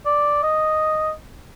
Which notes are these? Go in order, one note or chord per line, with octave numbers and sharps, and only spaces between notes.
D5
D#5